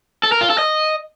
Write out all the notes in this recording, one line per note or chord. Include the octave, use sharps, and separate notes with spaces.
A4
A#4
F4
A4
D#5